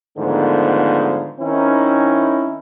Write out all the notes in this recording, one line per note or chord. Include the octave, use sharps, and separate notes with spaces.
G#2 D3 D#3 F3 A3 B3
D#3 C4 C#4 D#4 E4